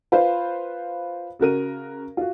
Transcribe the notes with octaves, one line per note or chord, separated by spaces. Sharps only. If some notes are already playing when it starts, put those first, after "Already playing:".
F4 B4 C5 F5
C#3 F#4 A#4 D#7
F4 F#4